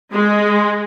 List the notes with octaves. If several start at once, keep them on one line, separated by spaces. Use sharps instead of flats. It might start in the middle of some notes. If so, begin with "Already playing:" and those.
G#3